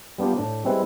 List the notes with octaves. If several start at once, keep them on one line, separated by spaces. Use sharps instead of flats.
G3 B3 D4 F4 G4
A2 D4
G3 G#3 C4 E4 B4